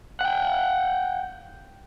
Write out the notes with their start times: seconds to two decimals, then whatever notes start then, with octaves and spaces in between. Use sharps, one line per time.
0.21 F#5 G5